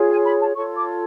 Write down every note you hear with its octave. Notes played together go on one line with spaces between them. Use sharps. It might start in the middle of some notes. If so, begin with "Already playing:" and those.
Already playing: F4 G#4 C#5
G#5
B5
A5
F4 A4 C#5 C#6
D6